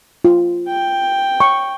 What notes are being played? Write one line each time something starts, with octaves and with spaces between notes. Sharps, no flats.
F4
G5
C#6